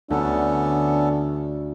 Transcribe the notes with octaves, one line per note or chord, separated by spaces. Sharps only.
D2 B3 C#4 D4 A4